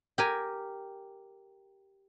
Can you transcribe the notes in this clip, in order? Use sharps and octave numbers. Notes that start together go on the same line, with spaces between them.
G4 A#4 G#5